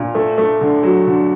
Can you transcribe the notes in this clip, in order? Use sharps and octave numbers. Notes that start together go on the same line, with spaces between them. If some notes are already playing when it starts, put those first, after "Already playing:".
Already playing: A#2
A3
A3
D3
F#3
D3